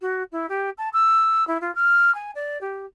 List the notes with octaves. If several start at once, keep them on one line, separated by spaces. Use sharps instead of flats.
F#4
E4
G4
A5
E6
E4
F4
F6
G#5
D5
G4